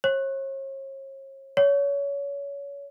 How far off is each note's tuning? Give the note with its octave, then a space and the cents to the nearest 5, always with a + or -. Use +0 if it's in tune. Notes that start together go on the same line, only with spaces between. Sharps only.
C#5 -40
C#5 +25